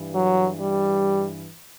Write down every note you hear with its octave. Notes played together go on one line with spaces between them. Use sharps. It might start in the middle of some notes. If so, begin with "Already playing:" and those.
Already playing: G2 E3
F#3
G3